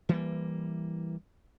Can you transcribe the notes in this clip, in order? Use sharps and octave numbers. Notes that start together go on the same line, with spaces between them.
E3 G3 A#3